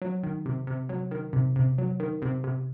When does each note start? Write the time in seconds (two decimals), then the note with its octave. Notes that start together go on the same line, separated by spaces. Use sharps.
0.02 F#3
0.23 D#3
0.46 C3
0.67 C3
0.89 F#3
1.11 D#3
1.33 C3
1.56 C3
1.78 F#3
2.00 D#3
2.22 C3
2.44 C3